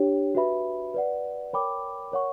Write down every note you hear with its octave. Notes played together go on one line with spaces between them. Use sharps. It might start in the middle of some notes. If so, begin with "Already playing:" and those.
Already playing: D4 G4 C#5 G5
F#4 B4 E5 B5
B4 D5 F#5
A#4 C#5 G5 B5 D6
A#4 C#5 F#5 C#6